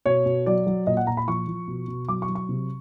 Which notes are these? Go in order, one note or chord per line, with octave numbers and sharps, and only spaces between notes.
B2 C#5
B2
F#3 D5
F#3
A#2 D#5
F#5
A#2 A#5
B5
F3 C#6
F3
B2
B2
F#3 D6
C#6
F#3
C#6
C3